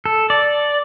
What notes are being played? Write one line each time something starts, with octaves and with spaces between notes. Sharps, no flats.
A4
D5